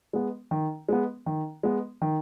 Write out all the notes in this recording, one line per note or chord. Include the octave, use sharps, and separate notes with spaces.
G#3 B3
D#3
G#3 B3
D#3
G#3 B3
D#3